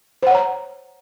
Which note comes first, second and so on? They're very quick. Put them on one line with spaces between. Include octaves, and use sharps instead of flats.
C5 F#5 C#5 A#5